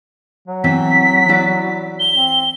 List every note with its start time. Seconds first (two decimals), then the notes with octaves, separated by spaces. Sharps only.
0.48 F#3
0.64 E3 C4 E5 B6
1.29 E4 F#4 D5
2.00 G7
2.16 C4